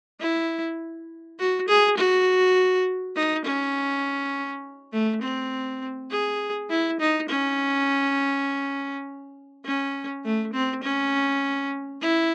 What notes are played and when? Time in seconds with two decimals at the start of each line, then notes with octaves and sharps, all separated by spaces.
0.20 E4
1.39 F#4
1.68 G#4
1.98 F#4
3.16 D#4
3.45 C#4
4.93 A3
5.22 C4
6.11 G#4
6.70 E4
7.00 D#4
7.29 C#4
9.65 C#4
10.24 A3
10.53 C4
10.83 C#4
12.02 E4